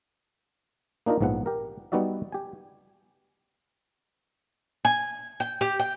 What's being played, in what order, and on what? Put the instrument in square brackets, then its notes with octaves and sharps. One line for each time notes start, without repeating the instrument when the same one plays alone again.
[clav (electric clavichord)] A#3 D4 D#4 F4 A#4
A#1 G#2 F3 B3 F#5
G4 A#4
G3 B3 D#4 F#4 D5 E5
G4 G#5
[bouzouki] G#5
G5
G4
G5